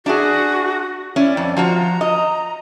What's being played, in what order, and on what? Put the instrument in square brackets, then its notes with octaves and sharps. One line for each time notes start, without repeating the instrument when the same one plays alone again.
[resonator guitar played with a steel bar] D4 E4 G#4 [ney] F#4
[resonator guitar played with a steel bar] C#4 E4 [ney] D5
[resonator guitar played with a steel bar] F2
[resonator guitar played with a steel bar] F3 F4 F#4 [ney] A#5
[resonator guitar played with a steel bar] D#5